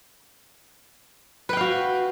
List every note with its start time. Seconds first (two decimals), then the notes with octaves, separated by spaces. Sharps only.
1.49 B4
1.53 G5
1.57 F5
1.61 F#4